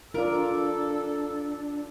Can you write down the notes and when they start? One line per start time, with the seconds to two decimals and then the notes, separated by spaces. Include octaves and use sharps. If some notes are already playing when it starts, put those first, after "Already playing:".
0.14 D4 F4 A4 A#4 D5